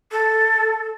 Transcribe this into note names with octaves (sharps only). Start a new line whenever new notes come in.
A4